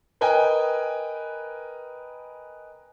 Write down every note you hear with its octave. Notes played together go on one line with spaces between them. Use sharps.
A#4 B4 D#5 G5 G#5